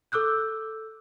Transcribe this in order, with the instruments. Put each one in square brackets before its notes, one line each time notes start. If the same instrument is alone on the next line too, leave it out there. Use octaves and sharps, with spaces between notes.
[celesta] A4 D6 E6 F#6 G6